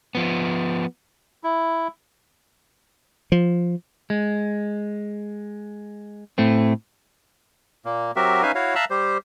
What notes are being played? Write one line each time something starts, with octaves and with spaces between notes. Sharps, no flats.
F3 B3
E4
F3
G#3
A2 A3 C4
A#2 A#3
F#3 C4 F#4 G4 A#4 E5
C#4 D#4 B4 E5 F5 G#5
E4 F#4 C#5 F5
E5 F5 A5 A#5 E6 F#6
G3 G4 C5